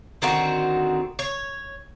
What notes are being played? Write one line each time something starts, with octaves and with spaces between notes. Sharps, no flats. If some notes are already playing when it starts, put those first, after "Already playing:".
D3 D#3 C4 F#4
C#5